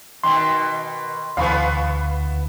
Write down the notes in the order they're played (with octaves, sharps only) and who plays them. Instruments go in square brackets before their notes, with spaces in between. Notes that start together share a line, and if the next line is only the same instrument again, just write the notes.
[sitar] B2 D#3 [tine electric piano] C6
[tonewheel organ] D2 [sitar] E3 B3 [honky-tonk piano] F5 B5 C#6